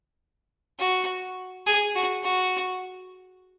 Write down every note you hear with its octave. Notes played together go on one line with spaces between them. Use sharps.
F#4
G#4
F#4
F#4